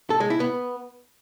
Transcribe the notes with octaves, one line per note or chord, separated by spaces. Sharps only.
A4
G#3
E4
B3